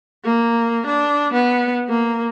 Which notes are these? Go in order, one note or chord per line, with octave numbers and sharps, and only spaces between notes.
A#3
D4
B3
A#3